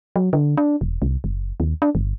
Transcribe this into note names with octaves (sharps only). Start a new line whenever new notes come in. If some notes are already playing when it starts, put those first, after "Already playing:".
F#3
D3
D4
E1
C2
F#1
D#2
D4
G1